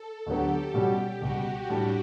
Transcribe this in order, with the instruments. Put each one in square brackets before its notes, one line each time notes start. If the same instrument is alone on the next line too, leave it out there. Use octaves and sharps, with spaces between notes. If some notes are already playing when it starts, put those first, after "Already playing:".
Already playing: [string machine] A4
[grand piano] D2 D3 F#3 B3 [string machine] G4
[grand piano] B2 G3 C#4 F#4 [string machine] G4
[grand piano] C#2 B2 G3 [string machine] F#4
[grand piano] A2 G3 D4